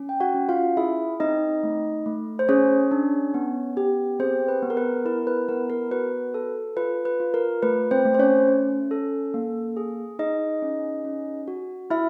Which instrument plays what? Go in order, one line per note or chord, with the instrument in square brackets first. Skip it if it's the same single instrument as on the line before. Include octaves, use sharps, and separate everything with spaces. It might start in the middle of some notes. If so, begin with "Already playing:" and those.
Already playing: [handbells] C#4
G5
F#4 F#5
C#4
F4 F5
E4 G#4 E5
C4 D#4 D#5
A3
A3
C5
C#4 G#4 C#5
D4
B3
G4
C4 G#4 C5
B4
B3
A#4
B4
E4 A#4
B4
B3 A#4
A#4
F#4 B4
A4
F4 B4
B4
F4
A#4
A3 B4
C4 C5
A3
C5
C#4 C#5
C#4
A4
A#3
G#4
D#4 G#4 D#5
C#4
C#4
F#4
E4 E5